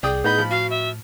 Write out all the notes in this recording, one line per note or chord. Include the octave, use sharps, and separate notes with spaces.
C2 G#4 D5 G5 D#6
A2 B3 D#4 B5 G6
F3 B5
F#4 F5
E5